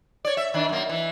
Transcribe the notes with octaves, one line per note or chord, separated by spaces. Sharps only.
C#5 D5
E5
D#3 D4
F#2 A#3
E3